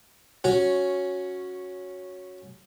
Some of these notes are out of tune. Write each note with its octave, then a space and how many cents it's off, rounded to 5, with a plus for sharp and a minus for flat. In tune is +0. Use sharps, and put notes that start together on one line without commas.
C#4 +0 F#4 -10